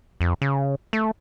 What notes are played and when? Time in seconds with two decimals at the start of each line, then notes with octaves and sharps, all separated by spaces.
0.21 F2
0.42 C#3
0.93 A3